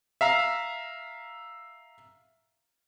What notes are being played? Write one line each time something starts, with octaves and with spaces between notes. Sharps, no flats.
E5 F5 A#5 E6